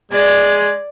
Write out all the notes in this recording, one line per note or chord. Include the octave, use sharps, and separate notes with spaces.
G#3 D5 G#6